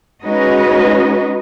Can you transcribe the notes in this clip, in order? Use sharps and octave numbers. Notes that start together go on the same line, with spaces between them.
G#3 C#4 D#4 F#4 B4 D#5